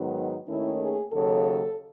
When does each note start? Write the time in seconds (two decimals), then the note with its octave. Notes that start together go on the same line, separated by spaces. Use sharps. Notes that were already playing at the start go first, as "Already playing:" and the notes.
Already playing: G#2 D#3 F#3 B3
0.16 D#4
0.48 D#2 D#3 A3 C#4 E4
0.80 G#4
1.12 D#2 C#3 F#3 A4